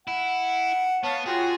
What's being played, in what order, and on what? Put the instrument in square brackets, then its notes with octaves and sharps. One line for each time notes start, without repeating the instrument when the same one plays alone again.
[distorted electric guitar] E4 [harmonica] F#5
[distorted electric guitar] B3 [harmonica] C#5 [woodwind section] F5 A5
[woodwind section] F4 F#4 [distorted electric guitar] G#4 [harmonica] G5